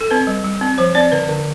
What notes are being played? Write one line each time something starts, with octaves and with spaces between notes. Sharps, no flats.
A4
C4 B4
G3
G3
C4
F3 C5
C4 D5
D3 B4
D3